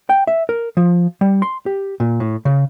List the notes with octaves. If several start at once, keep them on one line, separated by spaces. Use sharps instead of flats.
G5
E5
A#4
F3
G3
C6
G4
A#2
A2
C#3